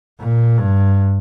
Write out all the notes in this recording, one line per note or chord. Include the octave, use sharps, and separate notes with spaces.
A#2
G2